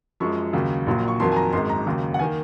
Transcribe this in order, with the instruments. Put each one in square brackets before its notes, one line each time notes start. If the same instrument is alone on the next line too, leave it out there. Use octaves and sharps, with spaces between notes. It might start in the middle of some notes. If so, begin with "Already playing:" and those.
[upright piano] F#2 F3 G#3 C#6
D#2 C#3 F#3
A#1 A#2 F#3 A#3
C#6
F2 D#3 F#3 A#3 C6
G#5
A#5
G#1 F#2 D#3 G#3 C6
A#5
D#2 C#3 F#3
F#5
D#3 A#3 G#5